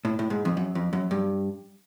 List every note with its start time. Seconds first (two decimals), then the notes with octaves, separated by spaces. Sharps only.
0.05 A2
0.19 A2
0.30 G#2
0.45 F2
0.57 F#2
0.75 F2
0.93 F#2
1.11 G2